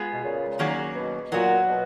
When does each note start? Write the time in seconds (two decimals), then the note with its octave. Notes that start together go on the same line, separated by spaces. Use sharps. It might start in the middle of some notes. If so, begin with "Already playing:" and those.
Already playing: G#3 B3 F4 G#4
0.13 B2
0.23 A#2 C#3
0.59 D#3 F#3 A#3 C#4 G#4
0.96 B2
1.32 A#2 F#3 B3 F#4
1.68 B2